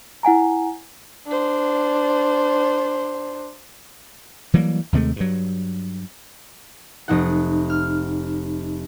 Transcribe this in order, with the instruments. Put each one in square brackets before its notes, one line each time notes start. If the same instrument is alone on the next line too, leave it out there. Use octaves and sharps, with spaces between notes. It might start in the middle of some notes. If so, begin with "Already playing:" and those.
[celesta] E4 F#5 G#5 A#5
[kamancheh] D4 C5
[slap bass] E3 F#3 G3 A#3
D#2 C3 G#3 A3
G2 F#3
[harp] F1 D#4 F#5
F6